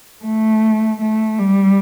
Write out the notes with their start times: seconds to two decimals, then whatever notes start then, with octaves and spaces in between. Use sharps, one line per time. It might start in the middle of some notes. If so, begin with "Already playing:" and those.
0.25 A3
1.01 A3
1.39 G3